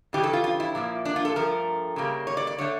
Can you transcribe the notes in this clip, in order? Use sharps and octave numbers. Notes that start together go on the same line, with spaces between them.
C#3 E3 G3 G4
A4
F4
F4
E4
A#2 F3 A#3
D4
F4
A4
G2 F3 A3 A#4
C#3 G3 A#3
C#5
D5
D5
D3 A3 C#5